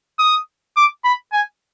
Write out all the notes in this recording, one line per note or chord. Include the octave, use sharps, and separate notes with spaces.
D#6
D6
B5
G#5